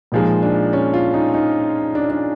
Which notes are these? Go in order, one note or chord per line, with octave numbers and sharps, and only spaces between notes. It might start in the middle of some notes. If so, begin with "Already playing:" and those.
A#2 F3 G#3 D#4
D4
C#4
F4
D#4
D#4
D4
D4